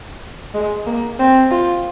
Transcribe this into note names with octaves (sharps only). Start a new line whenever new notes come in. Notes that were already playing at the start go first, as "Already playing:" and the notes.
G#3
A#3
C4
F4